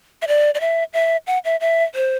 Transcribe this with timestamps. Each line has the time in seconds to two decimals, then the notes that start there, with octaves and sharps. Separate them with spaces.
0.22 E5
0.28 D5
0.55 D5
0.61 E5
0.93 E5
1.27 F#5
1.45 E5
1.61 E5
1.95 C5